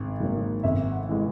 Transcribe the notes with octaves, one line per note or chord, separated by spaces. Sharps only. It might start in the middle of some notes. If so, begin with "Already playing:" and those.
Already playing: G#1
G#2 F#3 A#3
G#1 E5
F#5
E3 G#3